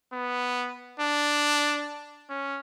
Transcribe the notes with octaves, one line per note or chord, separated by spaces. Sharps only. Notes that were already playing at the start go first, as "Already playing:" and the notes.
B3
D4
C#4